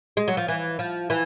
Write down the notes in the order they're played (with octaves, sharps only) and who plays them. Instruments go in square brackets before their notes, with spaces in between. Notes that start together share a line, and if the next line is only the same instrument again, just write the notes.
[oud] G#3
F#3
F3
E3
F3
E3